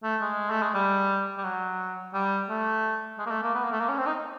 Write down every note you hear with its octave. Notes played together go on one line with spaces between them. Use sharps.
A3
G#3
A3
G#3
G3
G3
F#3
G3
A3
G#3
A#3
A3
A#3
B3
A#3
A3
A#3
C#4
C4
D#4